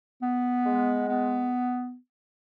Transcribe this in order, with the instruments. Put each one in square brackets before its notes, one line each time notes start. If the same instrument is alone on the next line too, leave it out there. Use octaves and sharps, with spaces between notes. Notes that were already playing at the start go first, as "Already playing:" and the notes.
[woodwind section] B3
G#3
B3